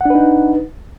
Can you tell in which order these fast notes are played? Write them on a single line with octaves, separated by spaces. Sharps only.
F#5 D4 B4 D#4